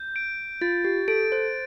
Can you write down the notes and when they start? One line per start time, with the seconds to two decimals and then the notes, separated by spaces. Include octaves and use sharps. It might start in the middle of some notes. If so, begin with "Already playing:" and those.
Already playing: G6
0.16 D7
0.61 F4 A6
0.84 G4
1.08 A4 D7
1.32 C5